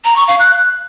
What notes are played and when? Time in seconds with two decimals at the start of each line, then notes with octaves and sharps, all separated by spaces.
0.05 A#5
0.16 C#6
0.28 F5
0.39 F#6